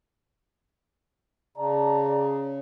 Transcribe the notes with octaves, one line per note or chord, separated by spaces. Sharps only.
C#3 D5 A5 A#5